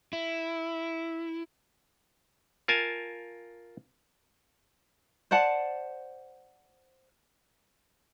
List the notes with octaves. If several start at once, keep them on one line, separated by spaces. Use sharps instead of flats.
E4
F4 A#4 G#5 A5
C5 D5 F#5 A5